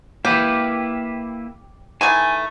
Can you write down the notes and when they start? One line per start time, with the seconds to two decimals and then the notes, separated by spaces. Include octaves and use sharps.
0.25 A#3 E4 G4 B4
2.01 D#3 E3 A3 G#5